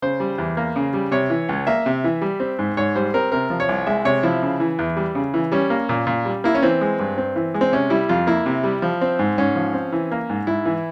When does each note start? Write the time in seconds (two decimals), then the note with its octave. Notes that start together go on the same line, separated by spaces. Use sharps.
0.02 C#3 C5
0.20 G3
0.38 E2
0.57 A#3
0.76 C#3
0.94 G3
1.11 C3 C#5
1.30 E3
1.49 C#2
1.67 A#3 E5
1.86 C3
2.04 E3
2.22 G3
2.40 C4
2.59 G#2
2.77 G#2 C#5
2.95 G3 C5
3.14 C4 A#4
3.32 C3 A#4
3.50 F3
3.60 C#5
3.69 C2
3.87 G#3 E5
4.05 C3 C#5
4.23 F3 E4
4.42 C#3
4.60 E3
4.79 E2
4.97 G3
5.15 C#3
5.34 E3
5.52 G3 C#4
5.70 A#3
5.89 A#2
6.07 A#2
6.25 G3
6.44 A#3 E4
6.55 C#4
6.62 E3 C4
6.81 G#3
6.99 G2
7.18 C4
7.36 E3
7.54 G#3
7.61 C4
7.72 C3 C#4
7.90 G3 E4
8.09 F2 F4
8.27 A#3 E4
8.46 C3
8.64 G3
8.82 F3
9.01 C4
9.19 G#2
9.38 G#2 C#4
9.56 F3
9.74 C4
9.92 E3
10.11 A#3
10.30 G#2
10.47 G#2 E4
10.66 E3